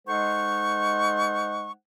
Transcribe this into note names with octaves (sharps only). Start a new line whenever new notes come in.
G#3 D#4 A4 C5 F#5 C#6